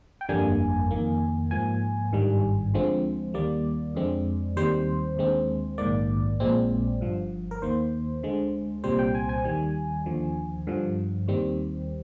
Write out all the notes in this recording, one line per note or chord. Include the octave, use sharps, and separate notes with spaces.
G5
G1 F2 D3 G3 A#3 G#5
F2 D#3 A#3
G#2 F3 A#3 G#5
G#1 G2 D#3 G3
D2 D3 F3 G#3 C4
D#2 D#3 G3 A#3 D5
F2 D3 G#3 C4
D#2 D#3 G3 C4 C5
D#2 D3 G#3 C4
A#1 G#2 D#3 A#3 D5
A#1 A#2 G#3 C4
G1 G2 F3
A#4
D#2 D#3 A#3 C5
D2 D3 G#3
C2 A#2 G3 C4 C5
G5
G#5
G#5
D#2 D#3 G3 G#5
D#2 D3 F3
G2 D3 F3
D#2 D#3 G3 C4